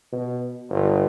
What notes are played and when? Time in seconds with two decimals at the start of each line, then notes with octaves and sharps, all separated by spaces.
0.13 B2
0.70 G1